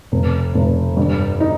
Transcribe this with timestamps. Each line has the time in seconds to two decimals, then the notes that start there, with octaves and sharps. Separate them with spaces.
0.12 F1
0.54 F1
0.97 G2
1.40 D#4